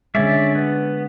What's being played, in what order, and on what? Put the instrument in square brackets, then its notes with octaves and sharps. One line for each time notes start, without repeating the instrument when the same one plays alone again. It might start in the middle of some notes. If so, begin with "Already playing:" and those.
[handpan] D3 G#3 [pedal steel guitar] C#4 D5 E5
[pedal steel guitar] B3